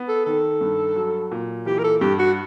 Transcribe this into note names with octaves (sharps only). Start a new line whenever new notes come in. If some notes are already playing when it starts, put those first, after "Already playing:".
Already playing: B3
A4
D#3 A4
G2
F#3
A#2
E3 G4
A#4
A4
G2 G4
F#4